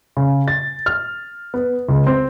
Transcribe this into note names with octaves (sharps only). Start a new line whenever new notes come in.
C#3
A6
F6
B3
C#2
C4